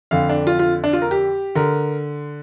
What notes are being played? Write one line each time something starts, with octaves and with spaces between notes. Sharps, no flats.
F2 D3 F5
D4
F4
F4
D4
F4
A#4
G4
D3 A#4